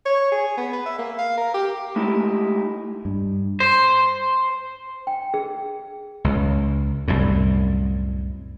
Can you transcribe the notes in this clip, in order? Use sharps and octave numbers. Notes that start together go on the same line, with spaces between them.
C#5
G#4
B3
B4
E5
A#3
F5
A#4
G4
G#3 A3 D#4 E4 G4
G2
C5
G5
G#4
C#2
C2 F#2 A2